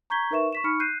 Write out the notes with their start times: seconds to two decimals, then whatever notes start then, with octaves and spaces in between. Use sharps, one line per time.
0.10 A#5 C#6 G6 G#6 B6 G7
0.31 D#4 A#4 B4 E5 C#6 E7
0.53 C#6 B6 E7
0.64 D#4 B5 C#6 F6 C#7
0.80 F#6 G6 C7 D#7